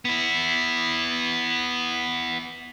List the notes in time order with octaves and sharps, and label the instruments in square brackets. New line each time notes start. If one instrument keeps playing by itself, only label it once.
[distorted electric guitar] B3 E4